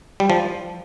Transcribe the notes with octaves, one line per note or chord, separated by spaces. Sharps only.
G3
F3